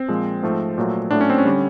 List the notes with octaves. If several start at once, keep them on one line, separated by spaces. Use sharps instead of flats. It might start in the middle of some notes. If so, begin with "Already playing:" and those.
Already playing: C4
A#2 F3 G#3
G#2 F3 A3
A#2 F#3 A3
A2 F#3 A3 D4
C#4
C4
C#4
D3 G3